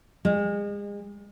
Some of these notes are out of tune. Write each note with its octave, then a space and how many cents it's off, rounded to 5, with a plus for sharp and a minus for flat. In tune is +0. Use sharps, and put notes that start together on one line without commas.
G#3 -35